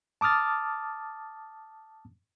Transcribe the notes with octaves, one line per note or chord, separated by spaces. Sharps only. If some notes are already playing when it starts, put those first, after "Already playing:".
A5 D6 D#6 F6 A6